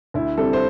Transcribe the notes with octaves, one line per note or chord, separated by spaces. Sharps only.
D2 E4
C3 G3 C4 A4
C5